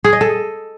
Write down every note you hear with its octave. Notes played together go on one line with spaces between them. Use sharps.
G#4
D#5
A4